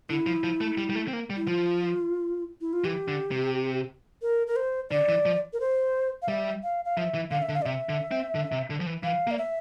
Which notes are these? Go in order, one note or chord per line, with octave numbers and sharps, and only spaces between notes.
D3 E4
F3
F3
A3
G3
G3
A3
C4
A#3
G3
E4
F3 F4
E4
F4
E3 G4
D3
C3
A#4
A#4
C5
D3 D5
E3
F3
A#4
C5
F5
G3 E5
F5
F5
F3 E5
E3
D3 F5
E5
D3
F5
D5
C3 E5
D3
C4
D3
C3
D3
F3
E3
E3 F5
A#3
D5
E5